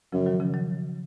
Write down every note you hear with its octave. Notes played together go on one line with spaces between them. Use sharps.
F#2 C#3 F3
D#3 F#3
C#3 F3
D#3 F#3